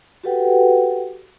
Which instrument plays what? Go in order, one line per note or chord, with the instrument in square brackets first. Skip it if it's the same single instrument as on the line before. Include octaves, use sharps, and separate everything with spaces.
[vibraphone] F#4 G4 A4 B4 F#5 G5